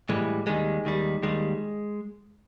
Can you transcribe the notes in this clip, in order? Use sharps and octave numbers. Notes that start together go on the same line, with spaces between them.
A2 E3 G3 G#3
D#2 D#3 G3 G#3
D#2 D#3 G3
D#2 D#3 G3 G#3